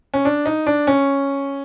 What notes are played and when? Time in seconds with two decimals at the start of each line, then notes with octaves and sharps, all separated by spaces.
0.14 C#4
0.25 D4
0.46 D#4
0.67 D4
0.87 C#4